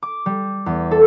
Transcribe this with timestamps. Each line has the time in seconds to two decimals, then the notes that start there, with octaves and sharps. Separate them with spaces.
0.03 D6
0.26 G3
0.66 E2
0.91 A4